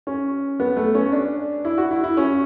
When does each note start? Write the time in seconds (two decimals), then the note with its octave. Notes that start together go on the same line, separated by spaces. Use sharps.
0.07 C#4
0.60 B3
0.77 A3
0.95 C#4
1.12 D4
1.65 E4
1.78 F#4
1.91 E4
2.04 E4
2.17 C#4